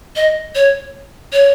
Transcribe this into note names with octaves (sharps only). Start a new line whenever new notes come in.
D#5
C#5
C#5